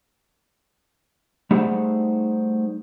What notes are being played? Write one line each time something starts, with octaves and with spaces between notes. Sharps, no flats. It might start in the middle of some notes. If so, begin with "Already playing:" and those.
G3 A3 D#4 G#4 C5 F#5